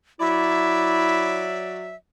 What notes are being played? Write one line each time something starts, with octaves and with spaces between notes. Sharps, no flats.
F#3 E4 D5 E5